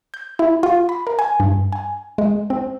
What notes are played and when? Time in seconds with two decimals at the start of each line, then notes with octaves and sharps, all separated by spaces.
0.14 G6
0.39 E4
0.63 F4
0.89 B5
1.07 A#4
1.19 G#5
1.40 G2
1.73 G#5
2.18 G#3
2.50 C4